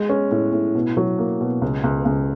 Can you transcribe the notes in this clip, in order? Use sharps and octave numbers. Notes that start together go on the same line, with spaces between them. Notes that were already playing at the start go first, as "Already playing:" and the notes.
Already playing: G#3
C#4
A2
A2
B2
F#3
A#3
B2
C#2
C#2
C#2